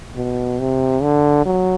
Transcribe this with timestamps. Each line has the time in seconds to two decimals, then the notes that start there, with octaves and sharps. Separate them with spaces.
0.16 B2
0.60 C3
1.03 D3
1.46 F#3